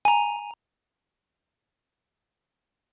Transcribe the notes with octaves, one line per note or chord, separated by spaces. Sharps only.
G#5 A#5